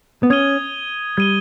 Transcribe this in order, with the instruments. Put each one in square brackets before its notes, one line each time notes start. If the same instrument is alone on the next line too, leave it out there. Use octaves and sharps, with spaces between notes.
[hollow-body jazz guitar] B3
[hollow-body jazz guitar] C#4 [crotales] D#6 G#6 D#7 G7
[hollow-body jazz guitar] G3 [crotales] G#6 D#7 G7